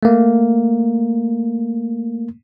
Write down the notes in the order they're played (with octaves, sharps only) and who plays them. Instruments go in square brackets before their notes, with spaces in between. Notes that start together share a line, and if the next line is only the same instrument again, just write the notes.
[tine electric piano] A3 A#3